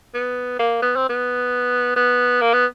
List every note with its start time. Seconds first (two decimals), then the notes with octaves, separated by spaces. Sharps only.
0.14 B3
0.59 A#3
0.82 B3
0.96 C4
1.09 B3
1.96 B3
2.41 A#3
2.53 B3